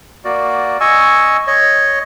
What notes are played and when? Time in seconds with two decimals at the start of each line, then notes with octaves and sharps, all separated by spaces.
0.25 A#3 F#4 D5
0.80 D#5 G#5 C#6 E6
1.47 C#5 D#5